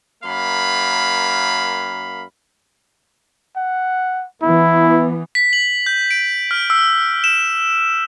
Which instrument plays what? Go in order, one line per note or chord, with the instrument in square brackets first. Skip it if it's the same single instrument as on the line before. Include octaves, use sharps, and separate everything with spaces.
[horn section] F#2 A#3 F5 B5
[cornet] F#5
[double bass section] E3 B3 [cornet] E4
[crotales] B6
F#7
G6
D7
F6
E6
E7